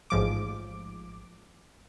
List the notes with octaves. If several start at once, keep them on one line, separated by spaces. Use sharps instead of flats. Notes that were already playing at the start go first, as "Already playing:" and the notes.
A1 G#2 F3 D6